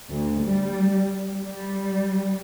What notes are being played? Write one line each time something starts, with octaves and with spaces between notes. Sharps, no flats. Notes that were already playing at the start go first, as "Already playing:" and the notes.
D2
G3
G3